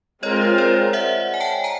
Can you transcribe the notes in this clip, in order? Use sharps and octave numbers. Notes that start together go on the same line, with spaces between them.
G#3 C4 F4 A#4 C#5 D#5
C5 D5
E5 F#5
G#5
G5 A5
G#5 A#5